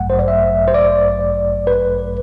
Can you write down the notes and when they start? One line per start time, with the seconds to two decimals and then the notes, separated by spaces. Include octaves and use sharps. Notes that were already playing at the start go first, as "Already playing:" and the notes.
Already playing: A1 G2 F#3 A3 F#5
0.10 C5
0.19 D5
0.28 E5
0.68 C5
0.74 D5
1.67 B4